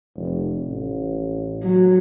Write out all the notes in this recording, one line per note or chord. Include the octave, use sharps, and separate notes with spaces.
F1
A1
F#3